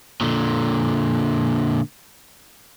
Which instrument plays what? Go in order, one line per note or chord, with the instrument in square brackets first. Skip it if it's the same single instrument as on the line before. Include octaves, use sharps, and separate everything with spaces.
[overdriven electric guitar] A#2 D3